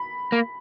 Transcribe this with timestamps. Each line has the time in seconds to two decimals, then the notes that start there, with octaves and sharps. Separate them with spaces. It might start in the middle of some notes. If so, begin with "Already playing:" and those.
Already playing: B5
0.32 A#3